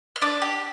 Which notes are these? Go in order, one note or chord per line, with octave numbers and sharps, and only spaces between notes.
F6
D4 D6
G4